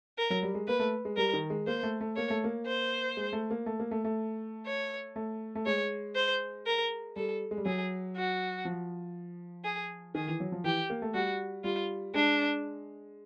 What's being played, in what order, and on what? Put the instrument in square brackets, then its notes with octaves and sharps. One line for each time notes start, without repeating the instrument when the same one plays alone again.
[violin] A#4
[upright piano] F#3
G3
G#3
[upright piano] A#3 [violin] B4
[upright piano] A3
G#3
[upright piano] G3 [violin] A#4
[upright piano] D#3
G#3
[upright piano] A#3 [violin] C5
[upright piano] A3
A3
[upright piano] A#3 [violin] C#5
[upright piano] A3
A#3
[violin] C5
[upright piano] G#3
A3
A#3
A3
A#3
A3
A3
[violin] C#5
[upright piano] A3
A3
[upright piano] G#3 [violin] C#5
[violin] C5
A#4
[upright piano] G3 [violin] A4
[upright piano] G#3
G3
[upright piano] F#3 [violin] G#4
[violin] F#4
[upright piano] F3
[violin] G#4
[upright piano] D#3 [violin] G#4
[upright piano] E3
F#3
F3
[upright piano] E3 [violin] G4
[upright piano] A#3
A3
[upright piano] G3 [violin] F#4
[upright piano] G3 [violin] F4
[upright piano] G#3 [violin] D4